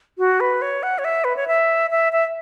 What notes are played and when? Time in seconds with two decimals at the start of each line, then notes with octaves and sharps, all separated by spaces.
0.18 F#4
0.40 B4
0.62 C#5
0.83 F#5
0.98 C#5
1.05 E5
1.24 B4
1.36 C#5
1.48 E5
1.91 E5
2.12 E5